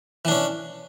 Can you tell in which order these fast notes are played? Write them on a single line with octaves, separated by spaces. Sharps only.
E3 D4 C#4